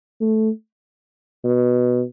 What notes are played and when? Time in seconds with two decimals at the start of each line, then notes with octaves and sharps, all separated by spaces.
0.20 A3
1.44 B2